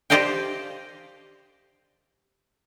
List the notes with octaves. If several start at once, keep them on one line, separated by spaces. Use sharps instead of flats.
G4 C5 D5 D#5 F5 G5